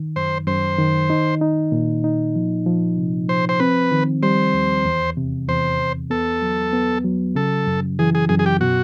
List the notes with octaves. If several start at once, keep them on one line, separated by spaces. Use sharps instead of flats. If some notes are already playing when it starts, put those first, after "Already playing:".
Already playing: D#3
F#2 C5
F#2 C5
D#3
D#4
D#4
A#2
D#4
F3
F3
C3
F3 C5
C5
C4 B4
D#3
G3 C5
D#2
E2
C3
E2 C5
E2
B3 A4
F#3
B3
F#3
C#3 A4
F#2
E3 G#4
G#4
F#2 G#4
G#4
G4
B2 F#4